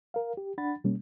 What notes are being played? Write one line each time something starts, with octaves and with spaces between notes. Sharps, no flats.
A#4 F5
G4
D4 F#5 B5 A6
B2 G3 A#3 C#4